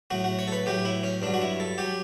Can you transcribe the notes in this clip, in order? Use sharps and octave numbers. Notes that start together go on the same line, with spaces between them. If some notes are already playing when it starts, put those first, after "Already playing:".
A2 F#3 F#4
F#4
C#5
A4
B4
A2 F#3 G4
E4
C#4
G2 F#3 D4
F#4
E4
A4
F#3 G4